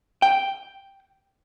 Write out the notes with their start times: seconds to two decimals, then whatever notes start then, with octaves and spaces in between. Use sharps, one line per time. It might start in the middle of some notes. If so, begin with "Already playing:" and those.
0.22 G5